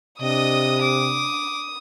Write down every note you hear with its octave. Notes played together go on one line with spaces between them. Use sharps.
C3 D4 D#5 D#6
D6